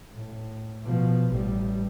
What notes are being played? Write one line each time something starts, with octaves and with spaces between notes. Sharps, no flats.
A2
B2 F3
A1 G3